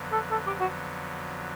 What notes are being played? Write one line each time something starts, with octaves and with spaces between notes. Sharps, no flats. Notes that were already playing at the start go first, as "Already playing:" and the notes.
Already playing: F2 D3 F#3 B3
A4
A4
G4
F#4